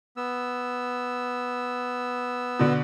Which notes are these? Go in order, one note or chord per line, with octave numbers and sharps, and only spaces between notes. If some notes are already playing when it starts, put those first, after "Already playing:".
B3 E6
B2 D3